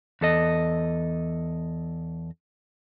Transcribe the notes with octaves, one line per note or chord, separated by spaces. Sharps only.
E2 A4 D#5